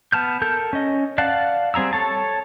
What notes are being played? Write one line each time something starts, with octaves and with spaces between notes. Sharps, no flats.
B3 A5 F6 G6
A4 A#4 A5 G6
C#4 D#5
D5 F5 F#5 A5
G3 C4 G#4 A#5 E6
A4 C#5 A5